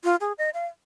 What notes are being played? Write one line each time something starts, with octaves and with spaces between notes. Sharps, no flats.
F4
G#4
D#5
F5